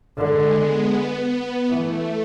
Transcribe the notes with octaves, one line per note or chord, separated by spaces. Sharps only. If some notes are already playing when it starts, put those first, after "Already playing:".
D3 G#3
B3
E3 A3